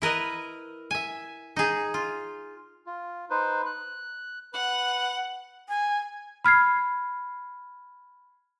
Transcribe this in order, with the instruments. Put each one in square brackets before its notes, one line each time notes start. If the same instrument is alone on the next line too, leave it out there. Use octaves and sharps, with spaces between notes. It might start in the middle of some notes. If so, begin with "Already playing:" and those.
[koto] E4 A#4 B4 D#5
E5 G#5
D#4 G#4
F4
[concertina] F4
D#4 B4 C5
F#6
[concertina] B4 [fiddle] F#5
[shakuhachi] G#5
[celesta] B5 F6 G#6 C7